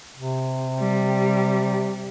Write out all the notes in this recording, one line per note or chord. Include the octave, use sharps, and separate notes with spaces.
C3
G3